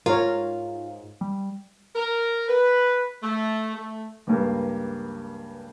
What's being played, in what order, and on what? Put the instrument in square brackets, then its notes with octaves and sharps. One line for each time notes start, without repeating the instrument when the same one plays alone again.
[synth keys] G#2 [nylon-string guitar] F4 [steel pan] A#4 C#5
[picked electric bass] G3
[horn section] A#4
B4
A3
A3
[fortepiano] C#2 G2 A#3